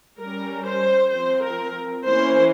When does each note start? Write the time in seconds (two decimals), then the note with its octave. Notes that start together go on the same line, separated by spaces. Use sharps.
0.20 G3 C#4 A#4
0.66 C5
1.12 F3 C4 C5
1.43 A#4
2.05 E3 A#3 C#4 C5